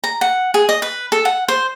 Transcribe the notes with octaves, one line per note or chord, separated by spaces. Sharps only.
A#5
F#5
G#4
D#5
B4
A4
F#5
C5